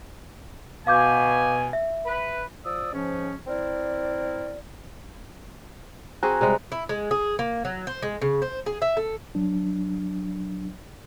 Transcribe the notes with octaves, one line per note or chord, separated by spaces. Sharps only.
B2 F5 G#5 D6 G6
E5
B4
F3 D5 D#6 E6
G#2 F3 C#4
C4 E4 A#4 D5
C4 F#4 G#4 G#5 A#5 F#6
C3 G3 G#3 A#5
E4
G#3
G#4
A#3
F#3
C5
G#3
C#3
C5
G#4
E5
A4
F#3 D4